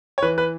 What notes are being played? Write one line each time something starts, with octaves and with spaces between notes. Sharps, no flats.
C#5
E3 B4
B4